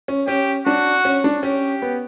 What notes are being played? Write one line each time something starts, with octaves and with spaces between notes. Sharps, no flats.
C#4
C#4 G4
D4 F#4
C#4
D4
C#4 G4
B3